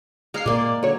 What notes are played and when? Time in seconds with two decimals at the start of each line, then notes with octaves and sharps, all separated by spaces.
0.34 G#3 G#4 F5 A#5 F6 C7
0.46 A#2 G#3 A#3 D5 C6
0.83 D3 F#3 C#5